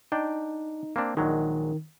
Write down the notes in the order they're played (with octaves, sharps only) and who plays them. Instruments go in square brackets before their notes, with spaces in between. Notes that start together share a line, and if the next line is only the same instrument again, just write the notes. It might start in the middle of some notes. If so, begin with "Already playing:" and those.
[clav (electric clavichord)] D4 D5 G5 [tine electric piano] D#4
[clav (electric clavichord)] A#3 C4 D4
[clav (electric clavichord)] A#1 F#3 G#3 [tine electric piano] D#3